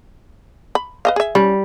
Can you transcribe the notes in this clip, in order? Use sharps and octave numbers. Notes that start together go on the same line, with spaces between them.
B5
B4 D#5 F5
G#4 E5
G3 C#4